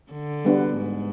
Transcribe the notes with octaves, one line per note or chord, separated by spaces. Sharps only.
D3
G3 B3 D4
G#2